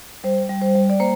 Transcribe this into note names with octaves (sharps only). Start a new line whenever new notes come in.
G3 C5
G3
C5
G3
D5
A#3 C5